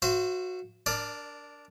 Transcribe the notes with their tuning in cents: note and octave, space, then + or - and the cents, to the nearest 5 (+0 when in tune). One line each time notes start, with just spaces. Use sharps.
F#4 -15 C5 +0 E5 +45
D4 -5 A#4 +0 D5 +30